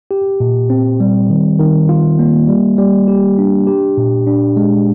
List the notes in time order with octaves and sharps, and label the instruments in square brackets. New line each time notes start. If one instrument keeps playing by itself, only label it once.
[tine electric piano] G4
A#2
C4
G3
D#3
D#3
F4
A#3
G3
G3
G4
D4
G4
A#2
D4
G#3